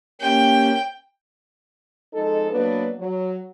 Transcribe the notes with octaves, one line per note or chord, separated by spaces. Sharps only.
A#3 C#4 G4 G5
F2 G#3 D#4 A4
F#3 A#3 B3 D4 B4
F#3